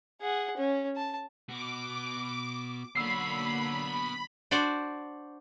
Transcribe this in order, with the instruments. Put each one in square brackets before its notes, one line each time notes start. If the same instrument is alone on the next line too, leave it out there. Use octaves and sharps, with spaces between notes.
[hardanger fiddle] G#4 F#5
C#4
A5
[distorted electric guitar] B2 F#4 [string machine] D6
[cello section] D3 F#3 A#3 [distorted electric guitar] B3 C#5 [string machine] B5 [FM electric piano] E6 C7
[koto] D4 F#4 C5 D5